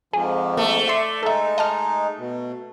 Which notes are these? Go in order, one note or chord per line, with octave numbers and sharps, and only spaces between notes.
F2 G#2 F3 G#4
A3 A#3
D5 E5 C6
G#3 D#4 A4 E5
D#5 A5 F6
B2